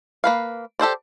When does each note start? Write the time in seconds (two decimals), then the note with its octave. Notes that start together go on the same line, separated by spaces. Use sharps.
0.24 A#3 B4 F5
0.79 G4 A4 C5 D5